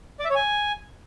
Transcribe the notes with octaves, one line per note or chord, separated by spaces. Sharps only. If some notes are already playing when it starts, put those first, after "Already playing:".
D5
E5
C#5
G#5